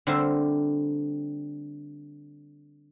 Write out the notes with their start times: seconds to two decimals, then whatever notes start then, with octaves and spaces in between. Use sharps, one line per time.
0.07 D3 G3 A3 C4 A#4 E5